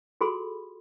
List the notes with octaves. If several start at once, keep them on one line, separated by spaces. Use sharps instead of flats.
F4 F#4 G#4 A4 B5 C6